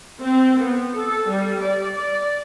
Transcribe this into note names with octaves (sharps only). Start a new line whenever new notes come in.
C4
B3
A4
G3
D5
D5